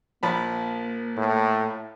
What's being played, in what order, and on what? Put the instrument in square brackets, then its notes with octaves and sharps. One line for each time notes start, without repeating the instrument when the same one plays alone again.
[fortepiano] A#1 F3 B5 [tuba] A#3
[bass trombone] A2